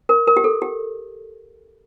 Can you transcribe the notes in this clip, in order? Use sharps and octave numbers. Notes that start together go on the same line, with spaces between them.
A#4
A#4
G4
A4
G4